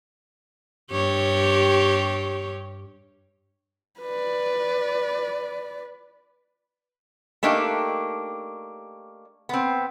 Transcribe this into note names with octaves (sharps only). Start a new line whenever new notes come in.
G2 G4 C#5
B4 D5
A3 A#3 D4 D#4 G4
B3 C4